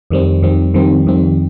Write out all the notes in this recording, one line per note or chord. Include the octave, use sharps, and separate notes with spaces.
F2 D#3 G3 C4
F2 D#3 G3 C4
F2 D#3 G3 C4
F2 D#3 G3 C4